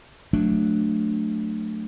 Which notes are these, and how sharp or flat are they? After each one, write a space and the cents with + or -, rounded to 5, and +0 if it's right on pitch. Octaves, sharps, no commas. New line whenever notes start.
F#3 -20 A3 -5 D4 +0